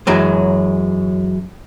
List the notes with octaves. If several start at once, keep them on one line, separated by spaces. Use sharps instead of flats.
F#2 E3 F#3 G#3